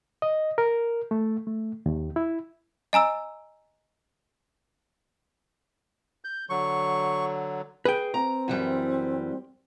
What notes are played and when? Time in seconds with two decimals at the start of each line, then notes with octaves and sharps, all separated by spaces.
0.22 D#5
0.58 A#4
1.11 A3
1.47 A3
1.86 D#2
2.16 E4
2.93 D#5 G#5 A#5 E6
6.24 G6
6.50 D3 F#3 C#6
7.85 G#4 B4 G5
8.14 C4 A#5
8.48 F#2 E3 G3